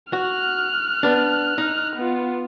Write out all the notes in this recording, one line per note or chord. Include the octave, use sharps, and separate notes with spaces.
F#4 F6 F#6
B3 D4
D#4
B3 F4